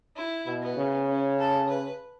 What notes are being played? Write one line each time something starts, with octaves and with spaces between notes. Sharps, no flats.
E4
B2
B3
C#3
C#4
A4
B4